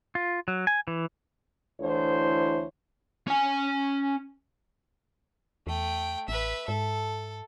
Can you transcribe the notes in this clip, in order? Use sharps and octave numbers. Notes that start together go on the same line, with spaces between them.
F4
F#3
G#5
E3
D2 D3 E3 E4 C5 C#5
C#4 G#5
E2 A3 G5
A1 B4 E5
G#2 A4